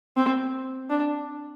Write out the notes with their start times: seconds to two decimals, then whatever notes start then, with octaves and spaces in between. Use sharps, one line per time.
0.17 C4
0.90 D4